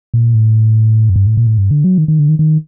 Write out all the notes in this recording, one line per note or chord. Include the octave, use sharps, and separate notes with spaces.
A#2
A2
F#2
G2
A2
A#2
A2
G2
D3
F#3
D#3
D#3
D3
D#3
D#3